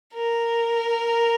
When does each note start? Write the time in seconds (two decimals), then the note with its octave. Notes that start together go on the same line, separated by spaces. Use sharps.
0.14 A#4